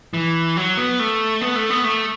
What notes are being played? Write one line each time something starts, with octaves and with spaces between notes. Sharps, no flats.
E3
F#3
B3
A3
B3
A3
B3
A3